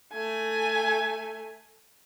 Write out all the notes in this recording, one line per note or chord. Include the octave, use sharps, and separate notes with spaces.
A3 G#5